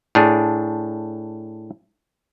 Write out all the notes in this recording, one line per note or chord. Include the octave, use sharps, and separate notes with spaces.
A2 D4 G#4